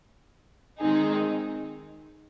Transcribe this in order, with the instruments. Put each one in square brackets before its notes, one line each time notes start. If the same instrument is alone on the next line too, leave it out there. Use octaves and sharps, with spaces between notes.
[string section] D#3 G#3 C4 D#4 G#4